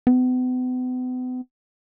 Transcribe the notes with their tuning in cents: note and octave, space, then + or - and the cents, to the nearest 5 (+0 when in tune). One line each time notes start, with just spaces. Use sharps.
B3 +40